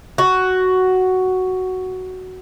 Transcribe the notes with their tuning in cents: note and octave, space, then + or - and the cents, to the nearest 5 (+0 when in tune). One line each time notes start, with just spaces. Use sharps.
F#4 +5